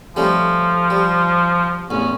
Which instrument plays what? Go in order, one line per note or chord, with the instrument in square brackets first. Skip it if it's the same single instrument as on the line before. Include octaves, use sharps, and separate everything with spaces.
[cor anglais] F3 [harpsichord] G3 A3 C#4
[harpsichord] G3
[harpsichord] A1 E2 [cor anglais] C#4